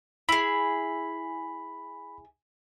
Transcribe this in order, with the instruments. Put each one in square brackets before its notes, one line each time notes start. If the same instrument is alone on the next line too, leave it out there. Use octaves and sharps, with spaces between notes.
[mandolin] E4 G#4 [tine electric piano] B5